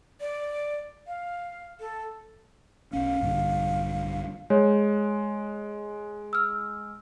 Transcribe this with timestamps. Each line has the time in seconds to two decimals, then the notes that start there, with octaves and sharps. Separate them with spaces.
0.20 D5
1.07 F5
1.80 A4
2.93 B1 C#4 F5
3.21 A#1 G2 D3
4.50 G#3 C#5
6.33 E6 F6